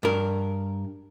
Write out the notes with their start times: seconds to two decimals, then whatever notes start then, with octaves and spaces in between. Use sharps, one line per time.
0.03 G2 A#4